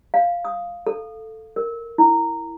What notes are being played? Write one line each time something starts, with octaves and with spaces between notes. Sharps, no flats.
F5
D#6
A4
A#4
E4